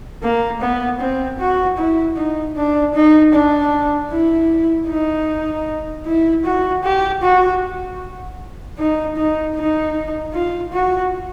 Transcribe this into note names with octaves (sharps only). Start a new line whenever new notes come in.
A#3
B3
C4
F#4
E4
D#4
D4
D#4
D4
E4
D#4
E4
F#4
G4
F#4
D#4
D#4
D#4
F4
F#4